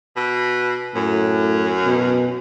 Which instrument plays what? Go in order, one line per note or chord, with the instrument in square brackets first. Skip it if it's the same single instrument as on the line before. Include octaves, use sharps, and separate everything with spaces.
[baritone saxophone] B2
[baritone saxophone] F#2 [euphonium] A2
[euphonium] B2